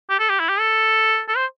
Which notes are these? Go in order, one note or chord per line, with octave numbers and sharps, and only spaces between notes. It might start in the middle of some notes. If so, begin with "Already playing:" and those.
G4
A4
G4
E4
G4
A4
A4
C5